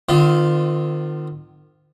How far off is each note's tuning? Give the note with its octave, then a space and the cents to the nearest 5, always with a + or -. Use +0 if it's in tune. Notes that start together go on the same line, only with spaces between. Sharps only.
D#3 -45 C4 -40 F4 +0